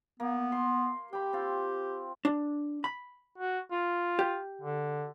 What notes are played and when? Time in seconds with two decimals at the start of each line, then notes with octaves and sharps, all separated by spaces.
0.20 A#3 B3
0.52 C6
1.13 G4 G5 B5
1.33 C4 F4
2.25 D4
2.84 B5
3.38 F#4
3.71 F4
4.19 G4
4.61 D3